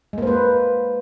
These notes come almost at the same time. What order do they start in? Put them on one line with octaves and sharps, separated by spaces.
G#3 A#3 C5 B4